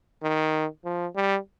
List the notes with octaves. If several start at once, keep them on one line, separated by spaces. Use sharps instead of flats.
D#3
F3
G3